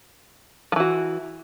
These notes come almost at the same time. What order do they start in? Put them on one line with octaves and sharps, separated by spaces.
F3 E3 F#4